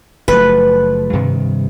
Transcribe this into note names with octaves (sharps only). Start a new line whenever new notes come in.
F#1 F3 A3 B4
G2 C3 D#3